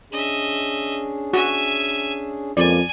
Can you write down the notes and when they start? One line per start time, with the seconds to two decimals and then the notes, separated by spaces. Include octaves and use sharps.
0.12 C#4 D4 G#4 D#5 E5
1.33 F#4 E5 G#5
2.57 F2 G#3 A#3 C#4 D5 G#5